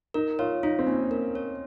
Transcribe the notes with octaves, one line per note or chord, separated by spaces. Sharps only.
D#4 A#4
F4 C#5
D#4 F4
C4
A#3 C#4
A#4
C#5